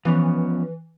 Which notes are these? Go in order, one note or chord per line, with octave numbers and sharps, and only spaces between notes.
E3 F3 B3 C#4